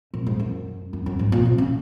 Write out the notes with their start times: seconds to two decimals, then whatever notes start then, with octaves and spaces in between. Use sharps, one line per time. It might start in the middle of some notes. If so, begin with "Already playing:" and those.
0.14 A#2
0.26 G#2
0.39 F#2
0.93 F#2
1.06 F#2
1.19 G#2
1.32 A#2
1.45 C3
1.58 C#3